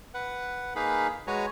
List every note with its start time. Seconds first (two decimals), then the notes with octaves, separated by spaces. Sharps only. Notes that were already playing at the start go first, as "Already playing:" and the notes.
0.14 B4 F#5
0.76 A#3 D#4 G#4 B4 F5 B5
1.27 G#3 F#4 B4 C#5 G#5 A#5